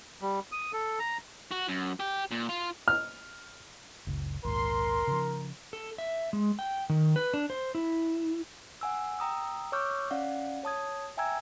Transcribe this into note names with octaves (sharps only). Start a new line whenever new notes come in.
G3
D#6
A4
A#5
F#4
F#2
G4
A#2
F4
F6
F#1 C#2
A#1 D#2 G#2 A#4 C6
C#3 F3
A4
E5
G#3
G5
D#3
B4
D4
C5
E4
F#5 G#5 E6
G5 A#5 D#6 E6
C#5 C#6 D6 E6 F6 G6
C#4 D5 F5 F#5
C#5 A5 D#6 G#6
E5 G5 G#5 A#5 E6 G#6